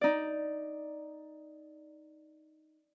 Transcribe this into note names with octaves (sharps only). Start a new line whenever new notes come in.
D#4 D5